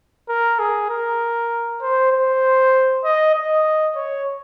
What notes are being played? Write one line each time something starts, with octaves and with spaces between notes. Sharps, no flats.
A#4
G#4
A#4
C5
C5
D#5
D#5
C#5